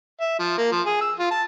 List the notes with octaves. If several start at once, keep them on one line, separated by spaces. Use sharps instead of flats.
E5
F3
A#3
F3
G#4
E6
F4
A5